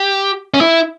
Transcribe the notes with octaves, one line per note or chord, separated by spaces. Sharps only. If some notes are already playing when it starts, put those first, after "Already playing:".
Already playing: G4
C#4
E4